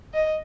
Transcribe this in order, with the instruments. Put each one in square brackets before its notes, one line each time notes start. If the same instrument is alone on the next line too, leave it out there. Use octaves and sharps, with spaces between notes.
[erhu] D#5